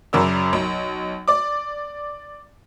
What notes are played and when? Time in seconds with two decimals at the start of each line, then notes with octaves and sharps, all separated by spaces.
0.13 F#2 C#3 F#3 A#4 D5 E6
0.53 B1
1.28 D5 D6